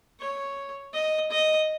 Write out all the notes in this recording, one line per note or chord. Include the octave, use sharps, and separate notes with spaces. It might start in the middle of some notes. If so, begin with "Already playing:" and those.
C#5
D#5
D#5